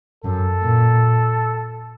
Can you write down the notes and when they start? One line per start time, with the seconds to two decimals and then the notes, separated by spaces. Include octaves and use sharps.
0.24 F#2 A4
0.63 A#2